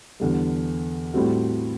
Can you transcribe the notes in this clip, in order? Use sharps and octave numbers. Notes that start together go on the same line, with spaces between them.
E2 D3 G3
A2 G3 C4 F#4